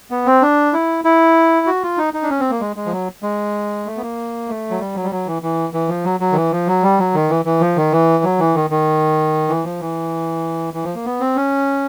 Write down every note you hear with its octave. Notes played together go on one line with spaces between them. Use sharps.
B3
C4
D4
E4
E4
F#4
F4
D#4
D#4
D4
C#4
C4
A#3
G#3
G#3
F3
F#3
G#3
A3
B3
A#3
A3
F#3
G3
F#3
G3
F#3
E3
E3
E3
F3
F#3
F#3
D#3
E3
F3
F#3
G3
F#3
D#3
E3
E3
F3
D#3
E3
F#3
E3
D#3
D#3
E3
F3
E3
E3
F3
A#3
B3
C4
C#4